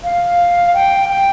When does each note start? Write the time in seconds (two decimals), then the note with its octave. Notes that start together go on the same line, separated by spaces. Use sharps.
0.04 F5
0.74 G5
1.09 G5